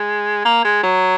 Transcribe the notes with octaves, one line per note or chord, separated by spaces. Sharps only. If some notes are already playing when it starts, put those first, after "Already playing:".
Already playing: G#3
A#3
G#3
F#3